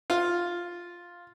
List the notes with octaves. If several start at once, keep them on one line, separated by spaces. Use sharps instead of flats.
F4